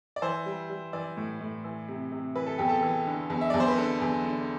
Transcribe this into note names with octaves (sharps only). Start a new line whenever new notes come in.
D5
E3 C5
G3
G3
E3 D5
A2
A2
E3
C3
C3
E3 B4
A4
E2 G4
A4
E3
D3
E2
E5
E2 D5
C5
B4
D3 A4
E2
D3